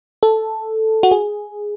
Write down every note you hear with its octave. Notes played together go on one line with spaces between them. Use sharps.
A4
F#4
G#4